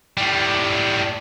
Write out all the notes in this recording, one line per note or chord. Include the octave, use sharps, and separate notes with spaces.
A2 G3